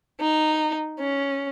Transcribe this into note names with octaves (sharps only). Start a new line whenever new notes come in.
D#4
C#4